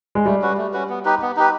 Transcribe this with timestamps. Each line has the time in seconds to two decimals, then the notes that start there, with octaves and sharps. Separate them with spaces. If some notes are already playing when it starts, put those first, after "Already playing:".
0.15 G#3
0.25 G3 A3
0.42 C#4 F#4 B4
0.57 A3
0.73 C#4 F#4 B4
0.89 B3
1.05 D#4 G4 B4
1.22 B3
1.37 D#4 G4 B4